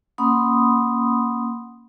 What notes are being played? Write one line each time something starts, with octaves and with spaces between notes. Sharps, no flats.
A#3 C#4 F#5 B5 C6 D#6